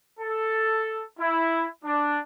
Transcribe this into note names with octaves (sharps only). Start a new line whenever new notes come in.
A4
E4
D4